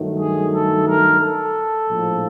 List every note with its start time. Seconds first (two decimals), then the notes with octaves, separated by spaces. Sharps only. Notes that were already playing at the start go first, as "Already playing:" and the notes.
Already playing: G2 D#3 F#3 A3
0.17 G#4
0.51 A4
0.85 A#4
1.19 A4
1.86 A#1 A2 F3 G#3